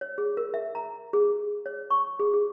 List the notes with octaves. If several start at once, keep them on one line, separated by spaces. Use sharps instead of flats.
C#5
G#4
A#4
E5
A#5
G#4
C#5
C#6
G#4
G#4